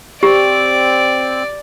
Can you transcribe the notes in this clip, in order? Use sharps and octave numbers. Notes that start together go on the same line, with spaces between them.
C4 G4 D5